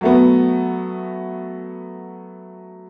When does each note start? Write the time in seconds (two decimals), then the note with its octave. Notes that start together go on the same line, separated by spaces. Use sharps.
0.01 F#3 A3 B3